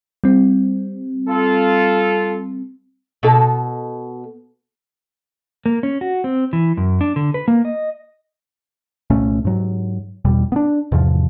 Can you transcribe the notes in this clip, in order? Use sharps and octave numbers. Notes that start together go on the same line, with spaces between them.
G3 C4
F4 A4
B2 A4
A#3
C#4
F#4
C4
E3
F#2
D4
D3
B4
A#3
D#5
C2 A#2 A3 C#4
G#2 F#3
G#1 E2 B2 G3
B3 D4
E2 G#2 C3 F3